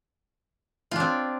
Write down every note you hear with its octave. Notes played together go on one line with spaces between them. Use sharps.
C4 D4 F4